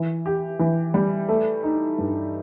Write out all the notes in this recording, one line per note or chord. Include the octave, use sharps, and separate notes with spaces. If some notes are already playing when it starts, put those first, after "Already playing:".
Already playing: E3
G4
E3
G3
A3
D#4
G2